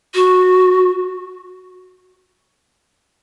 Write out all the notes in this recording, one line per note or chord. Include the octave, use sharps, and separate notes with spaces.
F#4